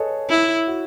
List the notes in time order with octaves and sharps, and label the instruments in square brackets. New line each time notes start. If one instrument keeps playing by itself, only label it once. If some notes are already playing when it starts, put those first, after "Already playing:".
Already playing: [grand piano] G#4 A4 B4 C#5 D#5
[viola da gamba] E4
[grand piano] F#4